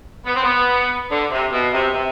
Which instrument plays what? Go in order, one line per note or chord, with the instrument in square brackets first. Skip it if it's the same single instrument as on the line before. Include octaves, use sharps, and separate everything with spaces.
[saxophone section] B3
C4
B3
D3
C3
B2
C3
C3